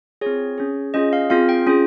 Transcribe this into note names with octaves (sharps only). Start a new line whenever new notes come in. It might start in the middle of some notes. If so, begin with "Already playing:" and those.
C4 F4 G#4 C#5
C#4 G#4
C#4 F4 G#4 D#5
F5
C4 F4 G#4 F5
G5
C#4 F4 G#4